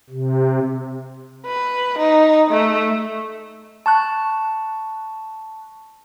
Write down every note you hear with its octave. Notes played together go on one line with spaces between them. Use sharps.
C3
B4
D#4
A3
A5 C#6 F#6